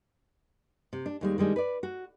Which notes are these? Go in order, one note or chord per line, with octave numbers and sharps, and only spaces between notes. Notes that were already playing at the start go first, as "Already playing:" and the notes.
C3
D4
D#2 G3 G#3
D#3 G3 G#3 D4
B4 D5
F#4